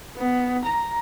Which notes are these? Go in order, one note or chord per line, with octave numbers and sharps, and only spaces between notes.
B3
A#5